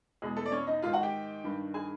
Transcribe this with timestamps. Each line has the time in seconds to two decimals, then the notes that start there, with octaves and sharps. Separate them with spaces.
0.22 E2 B2 G#3 G#4
0.37 A3 A4
0.46 D5
0.52 C#4 C#5
0.67 D#4 D#5
0.82 G#2 D#3 F4 F5
0.93 F#4 F#5
1.03 G4 G5
1.44 G2 D#3
1.74 G#4 G#5